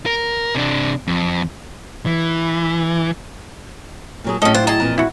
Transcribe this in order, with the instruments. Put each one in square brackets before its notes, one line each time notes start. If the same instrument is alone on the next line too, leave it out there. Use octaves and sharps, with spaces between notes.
[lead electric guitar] A#4
C3 D4
F2
E3
[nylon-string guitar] A#2 F#3 G#4
[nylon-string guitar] A2 F#3 [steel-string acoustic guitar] G#3 C#4 [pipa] A4 D#5
[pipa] D4 F4 [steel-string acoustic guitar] C5
[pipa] G#4 A#5 [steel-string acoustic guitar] D#5 A5
[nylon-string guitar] F2 A#2 E3 [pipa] A#5
[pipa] E4 F#4